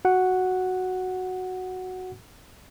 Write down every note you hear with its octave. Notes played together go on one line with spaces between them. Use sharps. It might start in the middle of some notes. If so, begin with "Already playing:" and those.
F#4 F#5